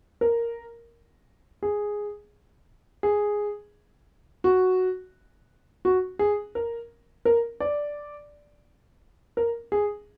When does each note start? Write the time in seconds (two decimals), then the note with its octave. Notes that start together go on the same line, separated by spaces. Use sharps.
0.21 A#4
1.63 G#4
3.03 G#4
4.44 F#4
5.85 F#4
6.19 G#4
6.55 A#4
7.25 A#4
7.60 D5
9.37 A#4
9.72 G#4